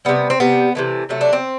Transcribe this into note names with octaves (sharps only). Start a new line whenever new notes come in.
C3 G3 B3
C4
C3 G3 B3
C3 E3 A3
C3 F#3 A3
D4
C4